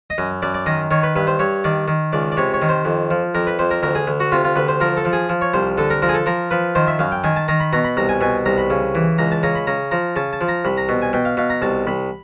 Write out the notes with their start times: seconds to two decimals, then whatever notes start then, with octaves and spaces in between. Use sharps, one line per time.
0.10 D#5
0.18 F#2
0.42 F#2 D5
0.54 D5
0.66 D#3 D#5
0.91 D#3 C#5
1.03 B4
1.16 G2 B4
1.27 C5
1.39 G2 C#5
1.64 D#3 D5
1.88 D#3
2.13 C#2 D5
2.32 D5
2.37 C3 C#5
2.54 C#5
2.62 D#3
2.69 C5
2.85 F2
3.11 F3
3.35 F2 A#4
3.47 B4
3.59 F2 C5
3.71 A#4
3.83 D2 A#4
3.95 G#4
4.07 D2
4.20 F#4
4.32 C3 F4
4.45 F4
4.56 D2 B4
4.68 C5
4.81 F3 A#4
4.97 A4
5.05 F3
5.13 G#4
5.29 F3
5.41 C#5
5.54 C2 C5
5.78 D3 A4
5.90 A#4
6.02 F3 A#4
6.09 G#4
6.14 A4
6.26 F3 A#4
6.51 F3 B4
6.75 D#3 C5
6.87 E5
6.99 F#2 F5
7.12 G5
7.24 D#3 G#5
7.36 A5
7.48 D#3 A#5
7.60 B5
7.73 B2 A#5
7.84 B5
7.97 C2 A#5
8.09 G#5
8.21 B2 G#5
8.46 C2 A#5
8.58 B5
8.70 C#3
8.95 E3
9.18 C#2 A#5
9.31 A5
9.43 C#3 A#5
9.55 B5
9.67 C#3 A#5
9.91 F3 A#5
10.16 C#3 A5
10.33 A5
10.41 F3
10.48 A#5
10.65 C2 B5
10.77 A#5
10.89 B2
11.02 G#5
11.13 B2 G5
11.25 F5
11.37 B2 F5
11.50 A#5
11.62 C2 A5
11.87 C2 B5